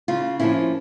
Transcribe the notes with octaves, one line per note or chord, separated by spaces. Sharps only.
C#3 F4
F3 A#3 C#4 E4